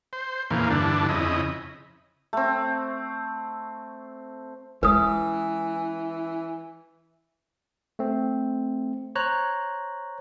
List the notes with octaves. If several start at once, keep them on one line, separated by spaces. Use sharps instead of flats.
C5
E2 A#2 C#3 E3 F3 A#3
G2 D3 E3 D4
F2 C#3 E4 D#5
A3 C4
E3 G#3 C#4 B4 D#6
A3 C4
C5 C#5 A#5 F#6